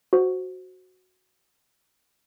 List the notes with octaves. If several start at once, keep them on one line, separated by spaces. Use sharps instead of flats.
F#4 C5